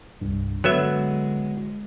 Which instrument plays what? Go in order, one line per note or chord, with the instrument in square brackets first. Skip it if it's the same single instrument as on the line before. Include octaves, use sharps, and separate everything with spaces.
[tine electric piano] C2 G2
[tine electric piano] D3 [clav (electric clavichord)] F#3 B3 E5 [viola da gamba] G#3